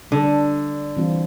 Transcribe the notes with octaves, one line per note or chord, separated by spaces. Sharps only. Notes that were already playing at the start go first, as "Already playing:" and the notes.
D3 G3 D4 A4
E3 G3 C4 F4